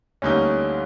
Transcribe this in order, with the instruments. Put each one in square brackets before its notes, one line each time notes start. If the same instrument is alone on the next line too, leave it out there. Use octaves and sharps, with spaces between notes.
[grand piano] D2 D3 G3 A#3 D#4 [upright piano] C#4